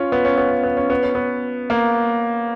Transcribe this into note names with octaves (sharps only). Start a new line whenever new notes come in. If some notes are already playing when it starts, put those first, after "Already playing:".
Already playing: C#4 F4
B3
C#4
B3
C#4
B3
C#4
B3
C#4
B3
A#3